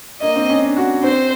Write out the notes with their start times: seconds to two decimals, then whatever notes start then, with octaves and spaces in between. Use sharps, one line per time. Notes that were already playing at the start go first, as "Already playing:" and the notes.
0.21 A#3 D#5
0.36 C4
0.49 C#4
0.62 D4
0.77 F#4
1.03 C4 C5